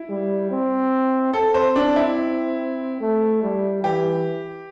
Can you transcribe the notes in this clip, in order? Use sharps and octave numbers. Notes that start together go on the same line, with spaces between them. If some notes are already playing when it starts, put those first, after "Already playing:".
Already playing: E4
G3
C4
C4 A4
C5
D4
E4
A3
G3
E3 G4